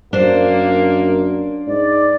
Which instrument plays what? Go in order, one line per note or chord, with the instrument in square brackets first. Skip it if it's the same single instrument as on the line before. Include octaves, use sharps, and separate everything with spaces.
[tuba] F#2 [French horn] A#3 [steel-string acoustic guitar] D4 C5
[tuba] G#2 [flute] D5